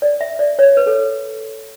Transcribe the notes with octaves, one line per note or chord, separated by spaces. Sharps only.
D5
E5
D5
C#5
B4
A4